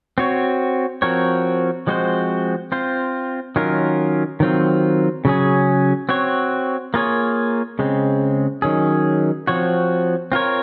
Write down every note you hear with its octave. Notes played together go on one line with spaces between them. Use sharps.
C4 F#4 C#5
F3 C4 F#4 A#4 C#5
F3 G#3 C4 F#4 C5
C4 F4 C5
D#3 F#3 C#4 F4 A#4
D#3 F#3 C4 F4
C#3 F#3 C#4 G#4
C4 F#4 C#5
A#3 F4 G#4 C#5
C#3 G#3 C4
D#3 F#3 C#4 G#4
F3 C4 F#4 C#5
C4 F4 A#4 C#5